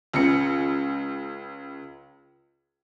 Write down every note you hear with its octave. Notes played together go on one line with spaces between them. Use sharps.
C#2 C#3 C#7